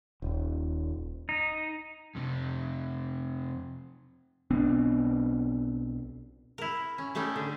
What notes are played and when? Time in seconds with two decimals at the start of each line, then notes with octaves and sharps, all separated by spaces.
0.22 D#1
1.29 D#4
2.15 F2 C3
4.51 B1 B3 C4 D4
6.58 E4 A#4
6.98 C#4
7.15 G3 A3 C#4 D#4 G4
7.36 D3